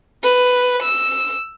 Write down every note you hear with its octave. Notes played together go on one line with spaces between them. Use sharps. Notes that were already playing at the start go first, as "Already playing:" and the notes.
B4
E6